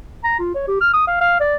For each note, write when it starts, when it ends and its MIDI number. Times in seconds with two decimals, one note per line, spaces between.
0.24 0.35 82
0.39 0.53 65
0.55 0.67 73
0.68 0.78 67
0.81 0.89 89
0.94 1.07 87
1.07 1.17 77
1.21 1.37 77
1.40 1.56 74